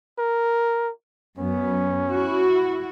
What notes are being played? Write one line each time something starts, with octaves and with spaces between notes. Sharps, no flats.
A#4
F#2 B3 C#4
E4 F#4